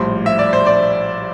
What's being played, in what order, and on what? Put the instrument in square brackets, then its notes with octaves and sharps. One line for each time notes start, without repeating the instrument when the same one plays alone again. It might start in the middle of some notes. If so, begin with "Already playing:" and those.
Already playing: [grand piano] A#1 A2 G3 C5
E5
D5
C5
D5